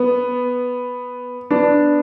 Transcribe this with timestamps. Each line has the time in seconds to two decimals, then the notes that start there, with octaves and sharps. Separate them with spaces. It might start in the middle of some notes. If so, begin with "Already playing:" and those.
Already playing: B3
1.51 B3 D4